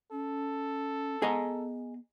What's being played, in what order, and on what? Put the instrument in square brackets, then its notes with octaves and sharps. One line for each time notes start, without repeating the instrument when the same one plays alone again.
[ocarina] C#4 [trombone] A4
[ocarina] B3 [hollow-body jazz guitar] G#4 D#5 A#5